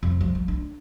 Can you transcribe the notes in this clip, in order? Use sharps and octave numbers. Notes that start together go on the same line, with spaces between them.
F2
F3
F3
D4